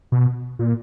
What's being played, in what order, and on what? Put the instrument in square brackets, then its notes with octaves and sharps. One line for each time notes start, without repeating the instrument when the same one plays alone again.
[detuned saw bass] B2
A#2